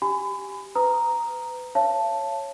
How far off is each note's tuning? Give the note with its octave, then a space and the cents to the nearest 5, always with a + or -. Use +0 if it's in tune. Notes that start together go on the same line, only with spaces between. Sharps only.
G4 -5 G#5 +0 B5 +35
B4 +30 A#5 +0 D#6 +0
C#5 -5 F5 -45 A5 +0